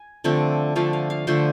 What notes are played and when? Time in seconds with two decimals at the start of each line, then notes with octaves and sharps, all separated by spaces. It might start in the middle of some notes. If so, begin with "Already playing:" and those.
Already playing: G#5
0.24 D3 F3 A3 C4
0.76 D3 F3 A3 F5
0.93 F5
1.10 F5
1.27 D3 F3 A3 C5